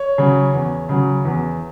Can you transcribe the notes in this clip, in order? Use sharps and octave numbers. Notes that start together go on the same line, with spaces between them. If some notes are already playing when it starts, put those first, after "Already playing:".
Already playing: C#5
C#3 F#3
E2
C#3 F#3
E2